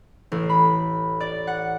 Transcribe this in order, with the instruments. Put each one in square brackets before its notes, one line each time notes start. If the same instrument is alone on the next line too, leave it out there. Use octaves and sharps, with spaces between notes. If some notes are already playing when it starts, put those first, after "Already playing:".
[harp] A1
B5
D5
F#5